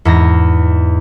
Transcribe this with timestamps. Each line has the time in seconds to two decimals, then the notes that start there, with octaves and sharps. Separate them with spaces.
0.05 E2 G#2 A#6